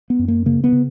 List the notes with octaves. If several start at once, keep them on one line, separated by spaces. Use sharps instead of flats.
B3
F#2
A#3
C#3 A#3
B3
C#3